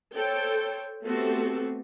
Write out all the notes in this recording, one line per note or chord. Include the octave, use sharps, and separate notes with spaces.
A4 C5 C#5 G5
A3 B3 C4 F#4 G4 A4